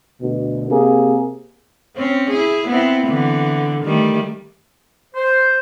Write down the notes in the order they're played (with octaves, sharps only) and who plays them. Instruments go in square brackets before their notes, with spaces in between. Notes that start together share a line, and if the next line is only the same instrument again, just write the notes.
[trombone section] D2 B2
C3 A#3 G#4
[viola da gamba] C4 C#4
E4 G#4
B3 C4 E4
D3 E3 B3
D#3 G3 A3
[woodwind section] C5